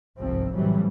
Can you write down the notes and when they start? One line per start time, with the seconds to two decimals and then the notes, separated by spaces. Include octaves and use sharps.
0.17 G1 C2 G#2 F3 C4
0.54 A2 C3 E3 F#3 G3